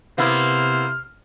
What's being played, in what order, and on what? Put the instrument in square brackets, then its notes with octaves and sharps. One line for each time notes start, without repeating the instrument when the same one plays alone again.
[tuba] C3 [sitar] A#3 B3 E4 [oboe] C5 [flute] F6